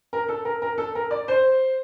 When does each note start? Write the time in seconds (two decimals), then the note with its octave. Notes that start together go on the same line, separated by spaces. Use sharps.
0.13 A#4
0.29 A4
0.45 A#4
0.62 A#4
0.78 A4
0.95 A#4
1.11 D5
1.28 C5